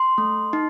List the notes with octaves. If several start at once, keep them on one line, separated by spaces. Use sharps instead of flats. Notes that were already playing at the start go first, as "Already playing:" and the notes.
Already playing: C6
A3
D#4